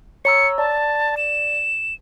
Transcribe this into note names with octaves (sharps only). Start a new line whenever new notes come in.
C#5 A#5 E6 C#7
D5 A5
E7